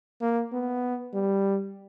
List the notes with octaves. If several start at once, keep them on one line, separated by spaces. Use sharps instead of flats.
A#3
B3
G3